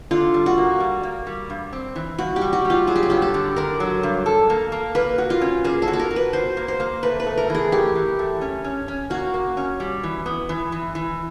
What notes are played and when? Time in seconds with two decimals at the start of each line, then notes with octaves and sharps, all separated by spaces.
0.11 D3 F4
0.34 G3
0.46 F#4
0.58 A#3
0.80 G3
1.03 A#3
1.27 G3
1.50 G2
1.73 C4
1.95 E3
2.18 G2 F#4
2.36 G4
2.41 G3
2.53 F#4
2.65 G3
2.70 F4
2.87 F#3 G#4
2.96 G4
3.03 F#4
3.10 G2 G4
3.22 A4
3.34 D3
3.56 D3 A#4
3.80 F#3
4.03 G2
4.26 A4
4.50 A#3
4.72 A#3
4.95 A#3 B4
5.18 F#4
5.30 F4
5.41 C#4
5.64 A#3 G#4
5.82 A4
5.88 F#4
5.93 A4
5.99 A#4
6.11 F#4
6.16 B4
6.33 F#4 C5
6.57 A#3
6.68 C5
6.80 A#3
7.03 A3 B4
7.20 B4
7.26 A3
7.38 A#4
7.50 E3 G#4
7.72 A3 G4
7.95 E3
8.19 A3
8.41 C#4
8.64 C#4
8.88 C#4
9.10 A#3 F#4
9.34 A#3
9.57 C#4
9.80 G3
10.03 E3
10.26 B3
10.49 E3
10.72 E3
10.95 E3